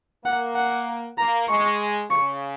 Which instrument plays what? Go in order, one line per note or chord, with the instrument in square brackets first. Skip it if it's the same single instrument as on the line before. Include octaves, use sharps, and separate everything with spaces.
[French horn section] A#3 [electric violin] F#5
[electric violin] F#5
[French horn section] A#3 [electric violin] A#5
[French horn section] G#3 [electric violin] C#6
[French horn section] C#3 [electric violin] C#6